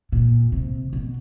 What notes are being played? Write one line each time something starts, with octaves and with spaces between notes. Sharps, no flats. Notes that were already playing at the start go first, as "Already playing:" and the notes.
A#2
C3
B2